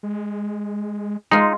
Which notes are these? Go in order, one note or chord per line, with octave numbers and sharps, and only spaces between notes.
G#3
G#3 D#4 F4